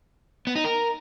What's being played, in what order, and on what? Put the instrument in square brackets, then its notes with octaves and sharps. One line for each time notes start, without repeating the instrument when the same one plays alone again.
[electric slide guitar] B3
D#4
A#4